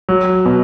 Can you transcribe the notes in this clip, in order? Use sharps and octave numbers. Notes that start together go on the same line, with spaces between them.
F#3
B2